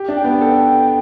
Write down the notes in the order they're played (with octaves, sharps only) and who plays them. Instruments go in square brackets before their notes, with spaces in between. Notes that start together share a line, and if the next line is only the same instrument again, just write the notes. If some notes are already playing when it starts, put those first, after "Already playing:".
Already playing: [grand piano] G4
D4
[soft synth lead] G5
[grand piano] B3
A4